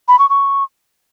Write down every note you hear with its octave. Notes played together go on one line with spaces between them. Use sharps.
B5
C#6
C#6